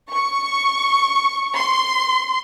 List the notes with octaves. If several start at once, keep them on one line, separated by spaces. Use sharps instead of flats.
C#6
C6